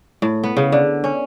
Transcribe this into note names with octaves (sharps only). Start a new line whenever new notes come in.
A2
B3
C#3
D3
C#4